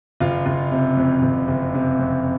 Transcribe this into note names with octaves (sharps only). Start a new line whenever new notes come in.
F#1 F4
F#1
C3
F2
F#1
F#1
C3
F2